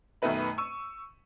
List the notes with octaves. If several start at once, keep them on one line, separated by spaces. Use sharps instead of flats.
F#2 B2 D#3 A3 B4 B5
C#6 E6 D#7